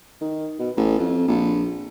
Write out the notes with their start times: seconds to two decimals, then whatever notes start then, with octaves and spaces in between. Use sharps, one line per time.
0.21 D#3
0.59 B2
0.77 A1
0.98 F2
1.28 A#1